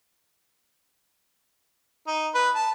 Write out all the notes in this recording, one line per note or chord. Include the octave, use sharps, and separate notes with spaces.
D#4
B4
A5